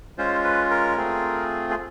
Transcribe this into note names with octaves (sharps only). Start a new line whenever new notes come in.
G#3 C#4 F4 C5
B4
A#4
A3 C4 F4 G#4
G#4